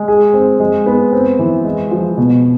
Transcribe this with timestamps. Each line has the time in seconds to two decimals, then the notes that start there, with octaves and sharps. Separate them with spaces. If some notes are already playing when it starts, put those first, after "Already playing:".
Already playing: G#3
0.08 G#4
0.34 C4
0.60 G#3
0.86 B3
1.12 C4
1.39 E3
1.65 G#3
1.91 F3
2.18 B2